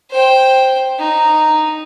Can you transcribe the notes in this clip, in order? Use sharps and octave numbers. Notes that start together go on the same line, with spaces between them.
C5 G5
D#4